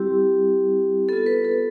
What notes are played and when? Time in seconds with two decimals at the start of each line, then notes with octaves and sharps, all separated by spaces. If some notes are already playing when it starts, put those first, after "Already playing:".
Already playing: G3 C4 E4 G4
1.09 B3 F4 A4
1.26 B4
1.45 A4